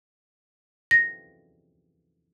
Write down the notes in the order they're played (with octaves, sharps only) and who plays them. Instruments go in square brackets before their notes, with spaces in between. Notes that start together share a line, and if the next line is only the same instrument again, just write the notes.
[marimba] A#6